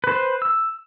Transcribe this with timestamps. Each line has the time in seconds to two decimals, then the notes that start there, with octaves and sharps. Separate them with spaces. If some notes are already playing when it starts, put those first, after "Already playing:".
0.04 B4 C5
0.42 E6